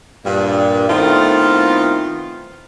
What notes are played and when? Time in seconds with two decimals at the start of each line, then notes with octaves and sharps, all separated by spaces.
0.25 G2 A#2
0.89 A2 D#3 A3 B3 C4 F4